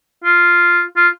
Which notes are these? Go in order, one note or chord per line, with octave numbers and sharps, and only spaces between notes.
F4
F4